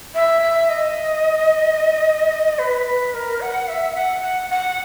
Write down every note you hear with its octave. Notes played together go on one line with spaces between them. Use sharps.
E5
E5
D#5
B4
B4
A#4
F#5
E5
F#5
F#5
F#5